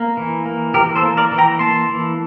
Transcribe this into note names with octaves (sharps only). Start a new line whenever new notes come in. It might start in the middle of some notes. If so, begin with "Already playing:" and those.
Already playing: A#3
E3
A#3
E3 G4 A#4
A4 C5
A#3
A#4 D5
E3
G5 A#5
A#3 A5 C6
E3